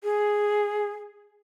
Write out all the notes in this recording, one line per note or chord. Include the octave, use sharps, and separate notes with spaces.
G#4